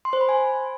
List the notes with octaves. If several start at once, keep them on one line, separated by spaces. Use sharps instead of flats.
C6
C5
B5
G#5